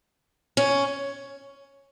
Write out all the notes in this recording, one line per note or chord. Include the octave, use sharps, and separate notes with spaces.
C#4